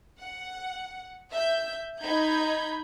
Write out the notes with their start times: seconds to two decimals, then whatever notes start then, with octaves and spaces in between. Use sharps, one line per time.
0.18 F#5
1.30 E5 G6
2.01 D#4 B5 G6 G#6